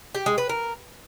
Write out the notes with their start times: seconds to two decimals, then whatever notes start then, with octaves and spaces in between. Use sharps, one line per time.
0.15 G4
0.26 G#3
0.38 B4
0.49 A#4